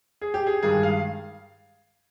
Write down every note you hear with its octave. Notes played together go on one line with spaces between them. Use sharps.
G#4
G4
G#4
G2 D#3 G#3 G#4
F5